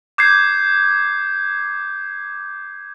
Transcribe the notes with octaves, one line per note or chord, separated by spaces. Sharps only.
D6 G6 G#6 C7